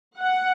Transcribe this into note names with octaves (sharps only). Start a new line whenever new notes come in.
F#5